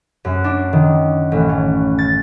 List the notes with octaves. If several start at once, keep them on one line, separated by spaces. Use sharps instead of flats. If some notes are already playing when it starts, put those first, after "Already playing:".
F#2
D4
D#3
A1
C#4
A6